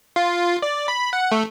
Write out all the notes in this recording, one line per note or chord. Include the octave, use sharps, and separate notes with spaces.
F4
D5
B5
F#5
A3